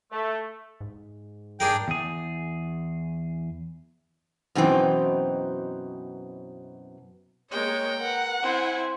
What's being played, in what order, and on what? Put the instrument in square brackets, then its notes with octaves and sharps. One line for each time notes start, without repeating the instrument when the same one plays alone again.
[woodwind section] A3
[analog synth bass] G#2
[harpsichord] D4 G#4 A#4 [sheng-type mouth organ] G5
[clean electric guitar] E2 G#4
[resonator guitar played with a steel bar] F#2 B2 E3 C4 D#4
[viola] G#3 A#3 [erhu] C#5 [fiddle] G5
[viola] A#4 B4 [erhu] F#5
[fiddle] C4 [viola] E4 G#5